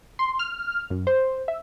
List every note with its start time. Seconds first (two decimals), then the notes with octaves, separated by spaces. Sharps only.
0.19 C6
0.39 F6
0.90 F#2
1.07 C5
1.48 E5